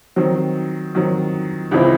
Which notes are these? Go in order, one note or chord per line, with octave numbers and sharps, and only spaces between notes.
D#3 F#3 C4
D#3 F#3 C4
C#2 C#3 E3 C4 D#4